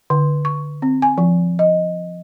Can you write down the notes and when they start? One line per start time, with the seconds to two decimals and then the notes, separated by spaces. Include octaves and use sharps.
0.10 D3
0.45 C#6
0.82 C4
1.02 G#5
1.18 F3
1.59 D#5